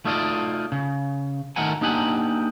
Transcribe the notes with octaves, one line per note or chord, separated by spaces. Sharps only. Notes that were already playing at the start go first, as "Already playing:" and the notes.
A3 D#4 F4 D5 D#5
C#3
D#3 A3 A#4 F#5 G#5
A#3 D4 D#4 G4 F#5 G#5